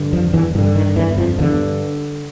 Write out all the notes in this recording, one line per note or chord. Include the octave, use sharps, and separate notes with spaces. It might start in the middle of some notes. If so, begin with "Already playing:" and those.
Already playing: G2 D3
F2 F3
E2 E3
G2 D3 D#3
D#3
E2 E3
F2 F3
E2 G2 D3 E3